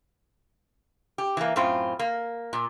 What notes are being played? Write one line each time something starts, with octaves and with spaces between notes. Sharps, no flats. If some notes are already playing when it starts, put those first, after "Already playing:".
G4
E3 A#3
F#2 A2 C4 F4
A#3
A#2